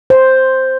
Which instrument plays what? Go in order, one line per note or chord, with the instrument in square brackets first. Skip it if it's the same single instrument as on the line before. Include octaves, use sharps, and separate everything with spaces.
[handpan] C5